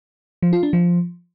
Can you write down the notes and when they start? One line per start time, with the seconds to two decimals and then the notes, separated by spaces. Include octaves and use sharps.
0.42 F3
0.53 F4
0.63 D4
0.73 F3